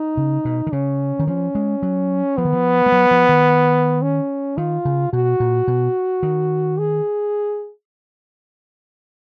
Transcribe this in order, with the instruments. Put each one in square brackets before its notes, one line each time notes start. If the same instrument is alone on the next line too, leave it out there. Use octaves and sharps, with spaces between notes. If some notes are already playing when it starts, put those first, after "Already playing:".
Already playing: [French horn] D#4
[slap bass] C#3
B2
D#3
[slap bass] C#3 [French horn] C#4
[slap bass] D#3
[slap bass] F3 [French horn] C#4
[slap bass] G#3
F#3
[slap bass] F3 [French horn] B3
[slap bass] D#3
F3
G#3
F#3
F3
D#3
[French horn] C#4
[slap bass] D#3 [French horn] F4
[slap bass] C#3
[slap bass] B2 [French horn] F#4
[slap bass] A#2
B2
D#3
[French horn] G#4